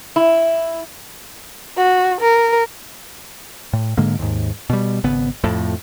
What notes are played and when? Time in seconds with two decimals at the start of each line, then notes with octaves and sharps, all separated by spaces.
0.16 E4
1.77 F#4
2.21 A#4
3.73 A2
3.97 G#2 D3 G#3 A#3
4.19 D#2 G#2
4.70 B2 G3
5.04 G#1 C#3 B3
5.44 F2 A2 F3